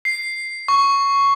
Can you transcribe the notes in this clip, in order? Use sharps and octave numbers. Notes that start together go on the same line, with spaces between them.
C7
C#6